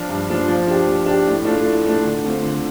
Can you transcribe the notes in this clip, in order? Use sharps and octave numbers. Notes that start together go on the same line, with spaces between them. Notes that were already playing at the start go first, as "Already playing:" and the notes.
Already playing: F3 D4 F4
G2
F3 D4 F4
F3
D4 G4
F3
D4 G4
A2
A3 D4 F4 A4
A2
A3 D4 F4 A4
D3
A3 C4 F4
D3